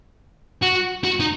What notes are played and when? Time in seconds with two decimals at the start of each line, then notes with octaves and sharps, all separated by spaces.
0.63 F#4
1.04 F#4
1.20 D#4